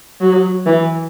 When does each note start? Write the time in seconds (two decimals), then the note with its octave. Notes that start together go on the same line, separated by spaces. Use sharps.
0.20 F#3
0.66 E3